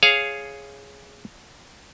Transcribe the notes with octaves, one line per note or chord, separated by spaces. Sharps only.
G#4 C#5 F5